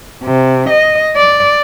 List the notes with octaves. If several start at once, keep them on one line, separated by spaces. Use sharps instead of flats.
C3
D#5
D5